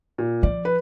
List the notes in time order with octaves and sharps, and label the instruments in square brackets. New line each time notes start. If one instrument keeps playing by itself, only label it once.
[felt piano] A#2
[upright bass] F3 [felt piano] D5
[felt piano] B4